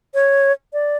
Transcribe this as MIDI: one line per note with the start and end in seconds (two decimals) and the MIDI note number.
0.15 0.52 73
0.73 0.98 74